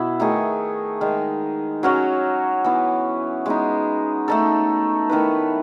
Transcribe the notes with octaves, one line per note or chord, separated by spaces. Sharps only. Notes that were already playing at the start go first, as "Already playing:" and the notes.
Already playing: B2 E4
D#3 A3 D#4 G#4
D#3 G#3 D#4
F#3 C#4 F#4 C#5
E3 B3 E4
G#3 B3 D#4
A3 D#4 A4
D#3 A3 E4 B4